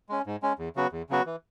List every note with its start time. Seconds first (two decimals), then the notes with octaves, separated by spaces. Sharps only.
0.09 G#3 C#4
0.26 G#2
0.42 G#3 C#4
0.59 E2
0.76 C#3 F#3 B3 F#4
0.92 E2
1.10 C#3 F#3 B3 F#4
1.26 E3